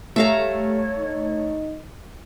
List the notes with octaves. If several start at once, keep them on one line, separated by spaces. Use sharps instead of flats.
G3 A3 C#5 E5 F5 A#5
D#4